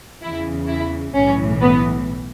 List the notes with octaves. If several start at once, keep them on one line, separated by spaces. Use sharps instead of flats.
E2 C#3 E3 E4
E4
B1 A2 E3 C#4
B3